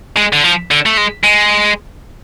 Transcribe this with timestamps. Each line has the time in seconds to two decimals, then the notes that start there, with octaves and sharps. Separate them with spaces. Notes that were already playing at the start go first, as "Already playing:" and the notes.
0.17 G#3
0.33 D3
0.44 F3
0.71 D3
0.86 A3
0.97 G#3
1.24 G#3